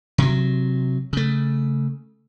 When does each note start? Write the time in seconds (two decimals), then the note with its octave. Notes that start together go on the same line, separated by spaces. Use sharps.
0.18 C3 F#3
1.13 C#3 A3